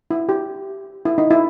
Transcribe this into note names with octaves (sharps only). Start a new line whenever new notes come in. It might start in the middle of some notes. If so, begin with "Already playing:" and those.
E4
G4
E4
D#4
E4